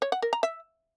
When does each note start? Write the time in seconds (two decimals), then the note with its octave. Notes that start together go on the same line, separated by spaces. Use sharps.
0.02 C#5
0.12 F#5
0.22 A#4
0.33 A#5
0.43 E5